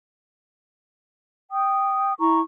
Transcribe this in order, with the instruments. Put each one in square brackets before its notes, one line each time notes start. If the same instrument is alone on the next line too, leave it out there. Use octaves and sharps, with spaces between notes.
[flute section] G5 D#6
E4 A#5 C#6